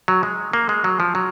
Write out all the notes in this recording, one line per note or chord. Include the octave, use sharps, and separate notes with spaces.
F#3
G#3
A#3
G#3
F#3
F3
F#3